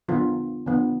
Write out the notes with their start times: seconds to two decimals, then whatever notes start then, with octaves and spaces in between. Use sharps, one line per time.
0.08 D3 F3 B3 F4
0.66 D3 F3 B3